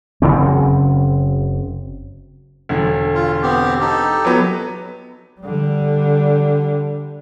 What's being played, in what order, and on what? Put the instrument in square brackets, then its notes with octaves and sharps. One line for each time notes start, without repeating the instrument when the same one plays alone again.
[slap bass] F#1 C#3 F#3 C4
[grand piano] E1 D3
[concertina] F4
B3 C4 G4
D#4 G4 A4
[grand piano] F#3 B3
[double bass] D3 G3